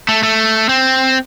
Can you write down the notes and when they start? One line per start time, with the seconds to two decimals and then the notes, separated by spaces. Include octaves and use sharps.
0.09 A3
0.23 A3
0.69 C4